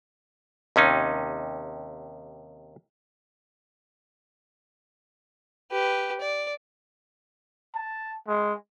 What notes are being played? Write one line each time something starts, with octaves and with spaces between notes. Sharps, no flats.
D#2 C3 C#4 D#4
G4 B4
D5
A5
G#3